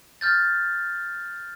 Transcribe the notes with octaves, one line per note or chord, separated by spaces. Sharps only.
F6 G6 A6